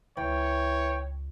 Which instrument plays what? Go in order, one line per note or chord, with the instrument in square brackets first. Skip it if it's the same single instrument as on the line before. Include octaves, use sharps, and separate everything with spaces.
[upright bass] C#2 [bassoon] E3 [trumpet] C#5 [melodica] G5